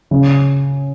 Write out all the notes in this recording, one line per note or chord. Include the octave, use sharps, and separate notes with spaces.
C#3